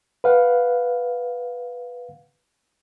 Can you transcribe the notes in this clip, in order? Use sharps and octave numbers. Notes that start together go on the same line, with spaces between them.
B4 F5 F#5